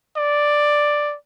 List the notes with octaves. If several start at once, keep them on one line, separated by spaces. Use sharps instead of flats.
D5